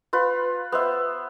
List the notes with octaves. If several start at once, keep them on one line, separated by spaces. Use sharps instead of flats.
F4 B4
B3 C5 E5